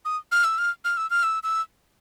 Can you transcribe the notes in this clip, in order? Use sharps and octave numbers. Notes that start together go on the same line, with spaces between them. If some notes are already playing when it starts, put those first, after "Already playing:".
D#6
F6
E6
F6
F6
E6
F6
E6
E6